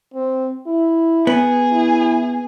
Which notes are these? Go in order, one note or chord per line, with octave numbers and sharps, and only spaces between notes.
C4
E4
B3 G#4
E4